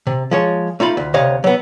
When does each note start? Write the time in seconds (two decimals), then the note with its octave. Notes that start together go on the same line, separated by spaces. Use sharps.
0.07 C3
0.31 F3 G#3 C#5
0.80 A3 D#4 F4 B5
0.97 D2
1.14 D2 C3 C#5 D#5 F5
1.44 F#3 B3